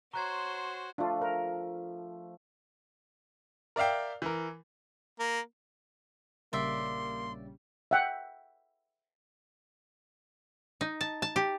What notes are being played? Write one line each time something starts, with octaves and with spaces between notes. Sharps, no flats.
F#4 C5 C#5 A#5 C6 C#6 F#6 G#6
F3 A3 D4 F4
A#4
A#4 D5 E5 F5 G5
E3 A#4
A#3
A#1 C#3 G3 A#3 D5 E5 C6
E5 F#5 G5
D#4
A5
A5
G4